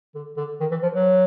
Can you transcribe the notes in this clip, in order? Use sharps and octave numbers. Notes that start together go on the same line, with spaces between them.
D3
D3
D#3
E3
F3
F#3